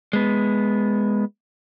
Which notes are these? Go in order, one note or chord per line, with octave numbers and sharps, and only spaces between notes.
G#3 B3